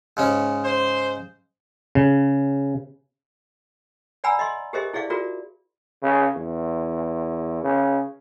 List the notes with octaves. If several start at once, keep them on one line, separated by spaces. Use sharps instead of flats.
G#2 C#3 C#4
C5
C#3
D5 F#5 G#5 A#5 B5 E6
D#5 E5 C6
G4 G#4 A#4 C5 D#5 E5
E4 G#4 D5 E5 F5
F4 F#4 G#4 A#4 D5
C#3
E2
C#3